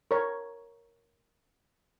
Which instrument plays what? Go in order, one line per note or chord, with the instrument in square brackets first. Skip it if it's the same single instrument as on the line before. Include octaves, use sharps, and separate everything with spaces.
[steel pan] A#4 C#5